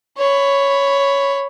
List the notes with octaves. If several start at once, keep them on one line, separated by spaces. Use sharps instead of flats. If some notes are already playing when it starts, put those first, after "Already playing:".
C#5 B5